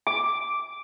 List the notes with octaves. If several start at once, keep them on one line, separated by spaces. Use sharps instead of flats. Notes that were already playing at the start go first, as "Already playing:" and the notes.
D6